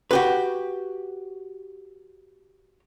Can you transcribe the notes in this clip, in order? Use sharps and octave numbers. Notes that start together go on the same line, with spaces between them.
F#4 G4 B4